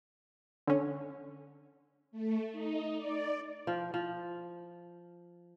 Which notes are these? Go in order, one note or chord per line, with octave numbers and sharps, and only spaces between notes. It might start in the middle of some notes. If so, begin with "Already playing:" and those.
D3 C#4
A3
D#4
D5
F3
F3